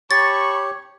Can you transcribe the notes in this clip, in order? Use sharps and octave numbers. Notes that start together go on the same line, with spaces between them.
G4 C#5 A5 B5 C#6 A6